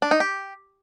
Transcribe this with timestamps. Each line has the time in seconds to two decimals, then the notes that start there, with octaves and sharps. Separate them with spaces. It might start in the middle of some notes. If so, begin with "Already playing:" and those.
0.02 D4
0.11 D#4
0.20 G4